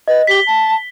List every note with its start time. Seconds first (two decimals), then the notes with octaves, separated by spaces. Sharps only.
0.08 B4 D#5
0.27 G4 B6 G7
0.46 A5